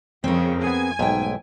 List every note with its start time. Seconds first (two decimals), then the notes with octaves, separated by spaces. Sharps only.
0.24 F2 C#3 C4 A#4
0.64 B3 G#4 G#5
0.99 B1 G#2 A3 G5